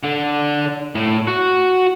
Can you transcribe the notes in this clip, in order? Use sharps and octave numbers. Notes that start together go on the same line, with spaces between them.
D3
A2
F#4